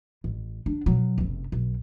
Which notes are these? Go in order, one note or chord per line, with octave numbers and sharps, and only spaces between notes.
A1
D4
B2 F#3
F#1 C3
B1